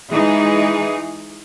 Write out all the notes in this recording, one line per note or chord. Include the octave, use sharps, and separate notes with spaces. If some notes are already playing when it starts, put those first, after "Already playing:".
E3 G#3 D#4 G#4